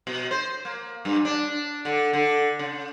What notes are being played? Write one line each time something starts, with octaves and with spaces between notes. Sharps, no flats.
B2
C5
A#3
G2
D4
D3
D3
C#3